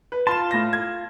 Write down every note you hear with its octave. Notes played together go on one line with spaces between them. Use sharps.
B4
F4 A5 C6 E7
A2 A#6
G#6